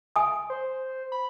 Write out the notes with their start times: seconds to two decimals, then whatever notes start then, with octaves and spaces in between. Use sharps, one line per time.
0.16 G#5 D#6
0.50 C5
1.12 B5